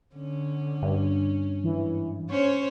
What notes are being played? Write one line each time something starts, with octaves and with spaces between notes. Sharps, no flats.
D3 C#4
G2
G#2 E3
C#4 C5 C#5 C#6